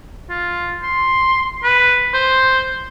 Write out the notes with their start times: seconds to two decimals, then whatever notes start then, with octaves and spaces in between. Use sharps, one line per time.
0.29 F4
0.83 C6
1.63 B4
2.14 C5